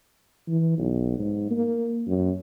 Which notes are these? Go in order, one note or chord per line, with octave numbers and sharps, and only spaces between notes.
E3
B1
G#2
A#3
F#2